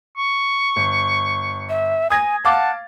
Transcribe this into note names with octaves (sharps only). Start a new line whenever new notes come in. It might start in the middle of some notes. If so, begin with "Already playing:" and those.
C#6
G1
E5
G#5 D#6 G#6 A#6
F5 F#5 A5 D6 A6